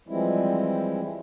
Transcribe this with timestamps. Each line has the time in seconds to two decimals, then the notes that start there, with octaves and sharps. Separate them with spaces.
0.08 E3 F3 G3 G#3 C4 E4